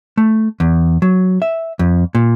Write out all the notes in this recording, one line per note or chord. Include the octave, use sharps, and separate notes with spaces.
A3
E2
F#3
E5
F2
A#2